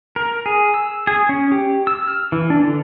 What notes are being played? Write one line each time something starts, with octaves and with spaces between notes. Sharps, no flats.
A#4
G#4
E6
G#4
C#4
G4
E6
F6
E3
D4
D3